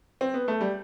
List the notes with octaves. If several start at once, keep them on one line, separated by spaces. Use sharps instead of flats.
C4
B3
A3
G3